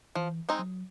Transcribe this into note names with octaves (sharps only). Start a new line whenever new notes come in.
E3 F3
G#3 C4 D#4
F#3